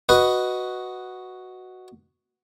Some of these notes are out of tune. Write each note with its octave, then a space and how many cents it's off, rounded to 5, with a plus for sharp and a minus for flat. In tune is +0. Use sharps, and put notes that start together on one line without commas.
F#4 +0 B4 +0 D#5 +0